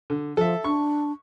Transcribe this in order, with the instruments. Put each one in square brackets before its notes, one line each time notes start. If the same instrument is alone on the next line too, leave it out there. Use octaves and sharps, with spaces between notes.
[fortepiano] D3
[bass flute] F3 [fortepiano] A4 E5
[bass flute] D4 [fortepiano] C#6